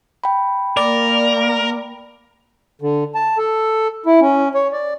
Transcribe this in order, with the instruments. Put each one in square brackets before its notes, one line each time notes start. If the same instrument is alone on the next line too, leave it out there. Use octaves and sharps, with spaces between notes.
[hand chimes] G5 B5
[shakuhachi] A#3 [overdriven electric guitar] A#4 [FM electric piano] D5
[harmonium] D3
A5
A4
E4
C#4
C#5
D5